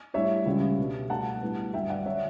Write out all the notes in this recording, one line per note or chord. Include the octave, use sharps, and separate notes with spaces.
A2 G3 D4 C#5 E5
C#2 C#3 G3 C#4
B2 G3 D4
B2 A3 D4 F#5 A5
A2 G3 B3
G2 D3 F#3 A3 E5 G5
D5 F#5
D3 F#3 C#5 E5